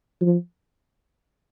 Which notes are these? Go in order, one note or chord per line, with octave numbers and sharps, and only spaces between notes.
F3